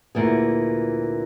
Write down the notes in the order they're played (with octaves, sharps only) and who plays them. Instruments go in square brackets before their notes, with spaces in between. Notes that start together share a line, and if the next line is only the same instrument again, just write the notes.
[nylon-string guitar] D2 A#2 E3 G#4